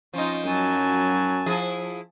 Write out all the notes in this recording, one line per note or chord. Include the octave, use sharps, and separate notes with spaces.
F3 C#4 D#4 F4
F#2 F#3 G#5 A5
F3 E4 G#4